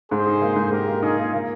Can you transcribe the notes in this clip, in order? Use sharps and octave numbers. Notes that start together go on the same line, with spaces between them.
G#2 G#4 C5
D#4
A#3
G#2
G#2 G4 A#4
A#3
D#4 F4 G#4
A#3
A#3